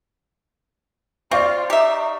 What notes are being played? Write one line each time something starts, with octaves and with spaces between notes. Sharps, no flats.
C4 F4 D5 F5 C#6
D#4 G4 E5